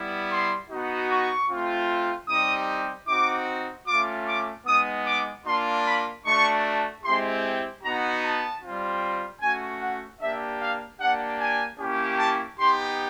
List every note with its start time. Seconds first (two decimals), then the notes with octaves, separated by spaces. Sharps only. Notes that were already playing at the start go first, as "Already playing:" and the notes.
Already playing: G3 B3 E4
0.31 C6
0.70 B3 D#4 F#4
1.10 C#6
1.50 A3 C4 F4
2.28 G3 C4 D#4 G4 D#6
3.08 C4 D#4 F#4 D6
3.88 A3 C#4 F4 D6
4.27 D6
4.66 G#3 B3 D#4 D#6
5.06 D6
5.45 A#3 D4 F4 C6
5.85 B5
6.25 A3 D4 F#4 C#6
7.04 G#3 C4 E4 G4 C6
7.83 B3 D#4 F#4 A#5
8.23 A5
8.63 G3 C4 F4
9.41 A3 C#4 F#4 G#5
9.81 F#5
10.21 A#3 D4 G4 E5
10.61 F5
11.00 A#3 D4 G4 F#5
11.40 G#5
11.79 A#3 C#4 E4 G4
12.19 A5
12.59 B3 D#4 G4 C6